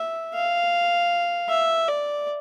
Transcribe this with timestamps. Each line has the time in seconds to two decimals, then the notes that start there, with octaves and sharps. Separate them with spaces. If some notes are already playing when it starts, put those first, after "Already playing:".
Already playing: E5
0.34 F5
1.49 E5
1.88 D5